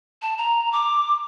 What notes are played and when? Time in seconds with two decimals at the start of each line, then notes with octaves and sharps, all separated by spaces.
0.22 A5
0.38 A#5
0.73 D6